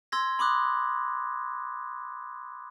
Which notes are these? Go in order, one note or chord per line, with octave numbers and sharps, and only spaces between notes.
C6 E6 G#6 A#6
B5 C6 D6 D#6 F#6